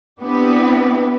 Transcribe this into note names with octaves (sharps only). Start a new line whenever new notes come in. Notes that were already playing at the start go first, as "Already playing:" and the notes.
B3 C4 D4 E4 G4 B4